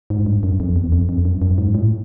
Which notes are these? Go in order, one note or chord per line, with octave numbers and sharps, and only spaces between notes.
G#2
G2
F#2
F2
E2
F2
F2
F#2
F#2
G#2
A2